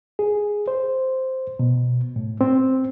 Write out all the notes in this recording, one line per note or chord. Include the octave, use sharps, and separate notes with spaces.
G#4
C5
B2
A2
C4